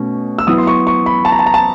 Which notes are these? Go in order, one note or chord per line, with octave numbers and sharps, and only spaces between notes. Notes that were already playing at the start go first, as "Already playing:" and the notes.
Already playing: B2 A3 C#4
E6
F#3 B3 E4 D#6
C6
C#6
C#6
B5
A5
A#5
A5
A#5
A5